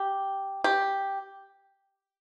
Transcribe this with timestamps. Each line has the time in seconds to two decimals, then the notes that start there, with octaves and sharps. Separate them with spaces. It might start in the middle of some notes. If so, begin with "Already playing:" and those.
Already playing: G4
0.64 G4